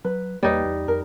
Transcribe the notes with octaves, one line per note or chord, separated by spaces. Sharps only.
F#3 B4
E2 G3 A#3 D#4 B4 C#5
E2
F2 A#4